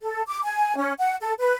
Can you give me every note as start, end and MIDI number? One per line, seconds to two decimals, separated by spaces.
0.01 0.22 69
0.27 0.42 86
0.43 0.74 80
0.77 0.92 61
0.99 1.15 78
1.21 1.33 69
1.39 1.57 71